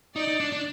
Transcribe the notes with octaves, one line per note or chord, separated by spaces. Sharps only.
D#4 D5
D#4
D4
D4